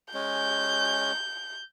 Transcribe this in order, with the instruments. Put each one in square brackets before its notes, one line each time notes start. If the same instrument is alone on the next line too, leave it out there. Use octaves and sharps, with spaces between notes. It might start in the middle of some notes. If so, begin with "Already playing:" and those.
[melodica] G#3 C#4 [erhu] G6